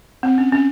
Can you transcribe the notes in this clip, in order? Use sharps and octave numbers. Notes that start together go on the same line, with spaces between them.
C4
C#4
C#4